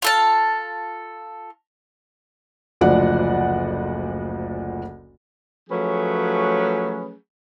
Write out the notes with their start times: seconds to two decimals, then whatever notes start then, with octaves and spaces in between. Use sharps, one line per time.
0.02 F4 A4 A5
2.81 F#1 D2 F3 D5 F#5
5.70 F3 F#3 A3 C#4 G#4 B4